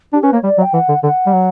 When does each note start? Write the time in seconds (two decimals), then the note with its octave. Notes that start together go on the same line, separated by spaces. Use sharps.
0.13 D4 G4
0.23 C#4 B4
0.33 A#3 C#5
0.43 G3 D5
0.58 F#3
0.61 G5
0.73 E3 F#5
0.88 D3
1.03 D3 F#5
1.26 G3
1.33 F#3